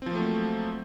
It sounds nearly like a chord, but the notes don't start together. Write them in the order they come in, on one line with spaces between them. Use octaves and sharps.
C4 F3 A#3 A3 F#3